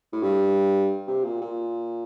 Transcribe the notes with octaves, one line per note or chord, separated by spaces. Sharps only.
A2
G2
C3
A#2
A#2